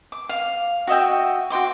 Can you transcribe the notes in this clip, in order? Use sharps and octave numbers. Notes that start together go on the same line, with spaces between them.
D6
F5
F#4 D#5 E5 G5
F#4 G5 C6 D6